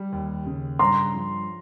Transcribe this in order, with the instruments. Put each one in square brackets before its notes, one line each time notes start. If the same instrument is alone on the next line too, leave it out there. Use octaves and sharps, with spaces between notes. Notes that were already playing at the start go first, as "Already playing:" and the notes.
Already playing: [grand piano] G3
D#2
C#3
[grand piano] G2 [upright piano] A#5 C6
[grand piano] F3